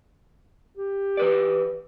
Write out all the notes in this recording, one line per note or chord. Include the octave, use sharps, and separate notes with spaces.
G4
E3 B4 D5